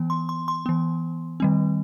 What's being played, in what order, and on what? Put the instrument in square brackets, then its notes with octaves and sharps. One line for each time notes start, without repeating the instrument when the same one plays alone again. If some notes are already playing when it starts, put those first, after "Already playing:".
Already playing: [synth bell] E3 B3
C6
C6
C6
E3 B3
D#3 G3 C4